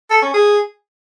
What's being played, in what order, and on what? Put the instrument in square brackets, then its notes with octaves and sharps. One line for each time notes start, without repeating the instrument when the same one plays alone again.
[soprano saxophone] A4
C#4
G#4